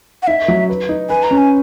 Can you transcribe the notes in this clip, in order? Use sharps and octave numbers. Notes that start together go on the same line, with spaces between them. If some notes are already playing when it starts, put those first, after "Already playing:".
F#5
D#4 E5
F#3
B4
D#4
B4 G#5
A#5
C#4
G#5